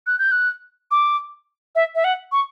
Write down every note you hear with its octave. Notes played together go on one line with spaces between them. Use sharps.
F#6
G6
F#6
D6
E5
E5
F#5
C#6